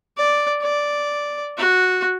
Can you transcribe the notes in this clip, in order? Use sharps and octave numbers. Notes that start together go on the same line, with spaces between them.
D5
D5
F#4